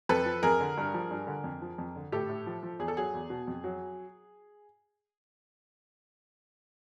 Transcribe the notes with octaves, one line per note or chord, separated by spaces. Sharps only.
F2 A4 B4
F3
F2 G#4 A#4
D3
G2
F3
G2
D3
F2
F3
F2
D3
A2 G4 A4
A2
F3
F3
E2 G#4
A4
F#3 G#4
E2
B2
F2
F#3